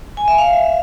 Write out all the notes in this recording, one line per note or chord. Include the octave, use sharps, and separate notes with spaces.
G#5
E5
F5